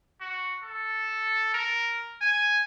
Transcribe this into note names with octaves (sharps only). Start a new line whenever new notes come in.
F#4
A4
A#4
G#5